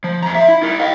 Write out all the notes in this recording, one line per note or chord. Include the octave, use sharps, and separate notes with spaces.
F3
F2 A#5
C#4 E5
E4
E4 A#4
D#5 F5